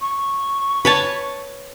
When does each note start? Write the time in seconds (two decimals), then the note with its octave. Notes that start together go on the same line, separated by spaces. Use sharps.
0.01 C#6
0.85 B4 C#5 A5